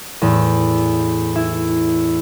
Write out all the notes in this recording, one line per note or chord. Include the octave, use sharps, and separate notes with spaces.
E2 A2
E4